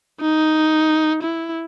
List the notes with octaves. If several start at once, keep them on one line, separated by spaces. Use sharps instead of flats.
D#4
E4